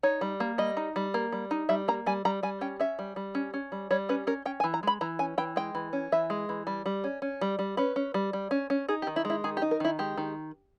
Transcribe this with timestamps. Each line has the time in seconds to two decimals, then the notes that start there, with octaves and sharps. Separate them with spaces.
0.03 D#4 C#5
0.21 G3
0.40 A#3
0.58 G3 D#5
0.77 D#4
0.96 G3
1.14 A#3
1.32 G3
1.51 D#4
1.69 G3 E5
1.88 A#3 A#5
2.06 G3 G#5
2.25 G3 A#5
2.43 G3 G#5
2.61 C#4 G5
2.80 C#4 E5
2.99 G3
3.16 G3
3.35 C#4
3.54 C#4
3.72 G3
3.91 G3 C#5
4.09 C#4 B4
4.27 C#4 A#4
4.45 C#4 G5
4.60 G#5
4.64 E3
4.74 A#5
4.83 G#3 B5
5.01 E3 A#5
5.19 C#4 G#5
5.38 E3 G5
5.56 G#3 G5
5.75 E3
5.93 C#4
6.12 E3 E5
6.30 G#3
6.49 E3
6.67 G3
6.86 G3
7.04 C#4
7.22 C#4
7.41 G3
7.59 G3
7.77 C#4 B4
7.96 C#4
8.14 G3
8.33 G3
8.51 C#4
8.70 C#4
8.88 D#4 G#4
9.02 G4
9.07 D#3
9.16 E4
9.25 G#3
9.30 E4
9.44 D#3 G#4
9.57 G4
9.62 D#4
9.71 A#4
9.80 D#3 E4
9.99 G#3 G4
10.17 D#3